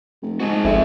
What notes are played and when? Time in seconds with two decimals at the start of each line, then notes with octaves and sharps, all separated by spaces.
0.22 F1
0.40 G#2 F#4 G#4
0.65 G1 F2 A#4 E5